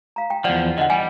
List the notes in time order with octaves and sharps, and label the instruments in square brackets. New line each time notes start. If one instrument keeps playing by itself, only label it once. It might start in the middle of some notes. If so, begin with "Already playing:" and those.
[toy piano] F5 A#5
G5
[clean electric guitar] E2 F3 [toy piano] D5 F#5
[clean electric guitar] D3 [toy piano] D#5 F#5
[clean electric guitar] G3 [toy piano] G#5